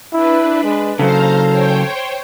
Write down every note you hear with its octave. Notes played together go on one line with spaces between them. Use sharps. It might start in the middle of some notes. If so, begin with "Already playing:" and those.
D4 E4 B4
G#3
C#3 F#3 A4 C5 F5 A#5
C5 C#5 G5